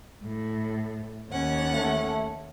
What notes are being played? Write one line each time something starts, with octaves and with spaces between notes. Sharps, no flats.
A2
D#2 C#4 F#5
A3